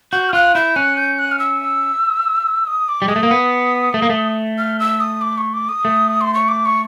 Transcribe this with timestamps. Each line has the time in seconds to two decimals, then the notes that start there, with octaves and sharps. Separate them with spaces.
0.12 F#4 G6
0.29 F6
0.33 F4 F#6
0.55 E4 G6
0.76 C#4 F#6
0.97 G6
1.19 F#6
1.31 F6
1.39 E6
2.67 D#6
2.88 D6
3.02 G3
3.08 G#3 D#6
3.16 A3
3.23 A#3
3.31 B3
3.94 A3
4.02 A#3
4.10 A3
4.58 F6
4.80 E6
5.00 D#6
5.21 D6
5.38 C#6
5.53 D6
5.69 D#6
5.85 A3
6.21 C6
6.34 C#6
6.48 D6
6.65 C#6